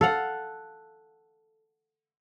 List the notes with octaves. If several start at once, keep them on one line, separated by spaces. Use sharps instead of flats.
A4 F5 F#5